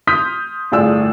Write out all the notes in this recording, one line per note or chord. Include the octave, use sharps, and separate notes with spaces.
C6 D#6 F6 G6 B6
G1 A2 F4 G#4 D5 E6